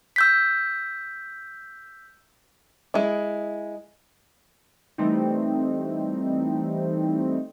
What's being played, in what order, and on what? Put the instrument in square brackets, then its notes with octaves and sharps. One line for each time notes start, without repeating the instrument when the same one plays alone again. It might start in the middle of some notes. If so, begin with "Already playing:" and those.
[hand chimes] E6 G6 B6
[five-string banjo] G#3 E4
[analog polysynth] E3 G3 A3 C4 D#4